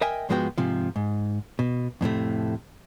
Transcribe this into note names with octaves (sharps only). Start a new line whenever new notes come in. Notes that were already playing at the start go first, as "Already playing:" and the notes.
A#4 D#5 E5 G5 G#5
G#2 F3 G#3 B3 F#4 G5
G#2 C3 F3
G#2
B2
F2 A2 C3 A3